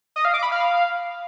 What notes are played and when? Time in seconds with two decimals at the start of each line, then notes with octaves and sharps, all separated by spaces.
0.16 D#5
0.25 F5
0.34 D6
0.43 B5
0.52 F5